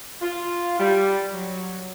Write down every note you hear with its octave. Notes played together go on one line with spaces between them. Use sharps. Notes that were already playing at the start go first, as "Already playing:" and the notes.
F4
G3
F#3